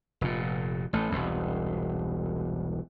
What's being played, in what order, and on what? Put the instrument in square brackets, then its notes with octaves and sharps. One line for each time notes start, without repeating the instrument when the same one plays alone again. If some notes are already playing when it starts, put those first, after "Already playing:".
[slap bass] F1 A#2
A1 A3
E1 C2